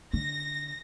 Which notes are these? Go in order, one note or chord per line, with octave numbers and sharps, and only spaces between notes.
D3 A#6